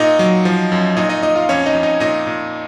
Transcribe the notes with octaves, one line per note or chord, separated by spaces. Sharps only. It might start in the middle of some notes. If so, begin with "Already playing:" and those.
Already playing: A#2 D#4 D#5
F#3
F3
F#2
A#2 D#4 D#5
D#4 D#5
A#2 D#4 D#5
F4 F5
F2 C#4 C#5
D#4 D#5
F2
D#4 D#5
A#2 D#4 D#5
A#2